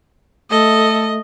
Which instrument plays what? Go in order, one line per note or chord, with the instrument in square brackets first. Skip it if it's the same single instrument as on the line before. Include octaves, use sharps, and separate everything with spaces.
[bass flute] A3 [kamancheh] A4 [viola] D#5